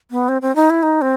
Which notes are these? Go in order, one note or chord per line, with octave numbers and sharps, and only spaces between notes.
B3
C4
C4
D#4
E4
D#4
C4